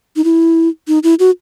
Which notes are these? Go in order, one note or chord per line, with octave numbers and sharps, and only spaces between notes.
D#4
E4
D#4
E4
F#4